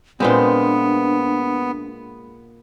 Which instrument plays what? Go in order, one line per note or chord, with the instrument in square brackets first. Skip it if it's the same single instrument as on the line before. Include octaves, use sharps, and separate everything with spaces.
[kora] A#2 G#3 [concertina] B3 [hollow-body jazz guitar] C4 B4 C5 [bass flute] D4